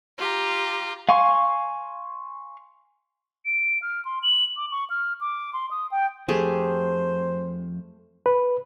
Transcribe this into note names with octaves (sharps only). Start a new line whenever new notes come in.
F4 G4 A#5
F5 G#5 C6 C#6
D7
F6
C6
F#7
D6
C#6
F6
D6
C6
D#6
G5
F2 A3 G4 G#4 C5
B4